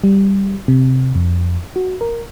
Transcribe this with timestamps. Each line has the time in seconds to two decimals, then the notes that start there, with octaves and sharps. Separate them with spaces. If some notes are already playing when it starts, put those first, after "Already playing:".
0.04 G3
0.68 C3
1.15 F2
1.76 F#4
2.01 A#4